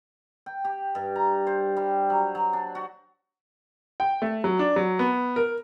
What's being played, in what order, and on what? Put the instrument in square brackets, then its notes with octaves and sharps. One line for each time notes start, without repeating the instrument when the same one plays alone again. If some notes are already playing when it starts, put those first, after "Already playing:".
[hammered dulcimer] G5
G4
G2
A#5
C5
G3
F#3
F#3
D4
F#4
[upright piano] G5
A3
F#3
D4
F#3
B3
A#4